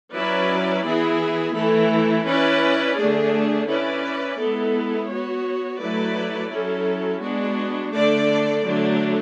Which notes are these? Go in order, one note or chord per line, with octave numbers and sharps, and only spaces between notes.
F#3 C#4 E4 B4 D5
E3 B3 E4 G#4
E3 A3 E4 A4
C#4 E4 B4 D5
D3 A3 D4 G#4
C#4 E4 B4 D5
G#3 B3 E4 A4
B3 F#4 C#5
F#3 A3 E4 B4 D5
F#3 C#4 E4 A4
G#3 B3 D4 F#4
D3 A3 D4 A4 D5
D3 F#3 A3 D4